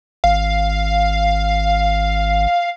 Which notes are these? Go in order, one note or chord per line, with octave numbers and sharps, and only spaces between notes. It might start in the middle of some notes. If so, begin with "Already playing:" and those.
G#1 F5